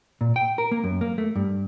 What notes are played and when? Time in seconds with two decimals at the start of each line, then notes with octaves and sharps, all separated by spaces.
0.21 A#2
0.36 G5
0.58 A#4
0.71 A#3
0.84 F#2
1.01 A#3
1.18 A3
1.36 G2